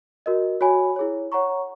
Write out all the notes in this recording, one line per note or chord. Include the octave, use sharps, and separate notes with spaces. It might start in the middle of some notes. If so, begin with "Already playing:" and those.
F#4 A#4 D#5
F#4 C#5 G#5 B5
E4 G#4 C#5
C#5 F#5 A#5 C#6